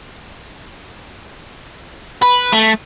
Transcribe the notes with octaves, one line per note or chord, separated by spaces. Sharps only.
B4
A3